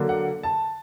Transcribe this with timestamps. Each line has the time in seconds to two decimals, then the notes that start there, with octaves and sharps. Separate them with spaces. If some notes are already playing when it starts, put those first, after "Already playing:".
Already playing: D3 F#3 A#3 D4
0.09 F#5
0.43 A5